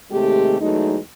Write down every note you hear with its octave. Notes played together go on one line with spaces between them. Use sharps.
D#2 C3 G#3 A3 G4
E2 F#3 G#3 A3 D#4